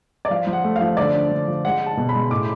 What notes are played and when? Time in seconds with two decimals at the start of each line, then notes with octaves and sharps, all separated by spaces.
0.25 D5
0.30 F3 F5
0.47 F3
0.53 F#5
0.64 A3
0.76 F5
0.81 F3
0.97 D3 D5
1.14 D4
1.31 D3
1.47 F3
1.65 G#3 F#5
1.81 G#3
1.86 A5
1.97 B2
2.09 B5
2.15 G#3
2.31 A2 D6